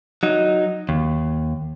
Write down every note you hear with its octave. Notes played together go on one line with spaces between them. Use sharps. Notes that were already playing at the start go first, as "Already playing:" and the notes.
F#3 D#4
D#2